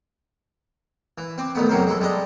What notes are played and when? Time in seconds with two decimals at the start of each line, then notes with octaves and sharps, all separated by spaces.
1.18 E3
1.38 C4 D6
1.55 A1 D#3 A3 B3
1.69 F2 C3 F#3 A#4 C5
1.87 G#3 E4 A4
2.00 G3 G#3 D4 D#5